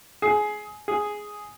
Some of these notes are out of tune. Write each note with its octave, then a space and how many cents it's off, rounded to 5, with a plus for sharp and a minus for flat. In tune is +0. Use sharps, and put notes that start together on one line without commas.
G#4 +15
G#4 +0